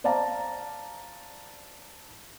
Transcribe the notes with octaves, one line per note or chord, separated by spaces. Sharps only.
C5 D5 F5 A5 A#5